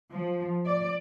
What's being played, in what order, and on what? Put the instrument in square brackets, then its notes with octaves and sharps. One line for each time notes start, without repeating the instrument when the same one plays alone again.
[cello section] F3
D5